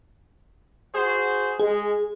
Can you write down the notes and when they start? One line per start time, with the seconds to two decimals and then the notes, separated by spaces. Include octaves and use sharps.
0.94 F#4 G#4 C5
1.60 G#3 G#4